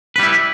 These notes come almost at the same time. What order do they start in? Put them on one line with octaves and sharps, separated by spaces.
B4 G3 E4